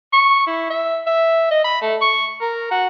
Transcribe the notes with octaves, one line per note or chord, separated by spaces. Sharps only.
C#6
E4
E5
E5
D#5
B5
A3
C#6
A#4
F#4